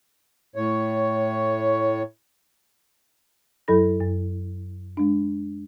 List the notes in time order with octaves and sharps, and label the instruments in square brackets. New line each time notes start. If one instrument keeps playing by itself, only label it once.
[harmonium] A2 C#5
[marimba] F#2 F#3 E4 A4 B5 A#6
F#2
G#3 D4